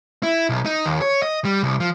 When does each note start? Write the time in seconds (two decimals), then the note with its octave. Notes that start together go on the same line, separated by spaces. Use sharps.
0.23 E4
0.49 B1
0.66 D#4
0.86 D#2
1.02 C#5
1.23 D#5
1.45 G3
1.63 C2
1.80 F3